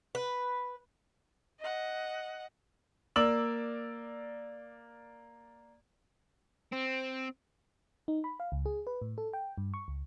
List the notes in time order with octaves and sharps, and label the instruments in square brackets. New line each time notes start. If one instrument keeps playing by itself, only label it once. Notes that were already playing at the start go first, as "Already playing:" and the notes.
[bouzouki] B4
[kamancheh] D#5 F#5
[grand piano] A#3 D5 E6 F#7
[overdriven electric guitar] C4
[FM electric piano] D#4
B5
F5
C#2
G#4
B4
A2
A4
G5
G2
C#6
C#2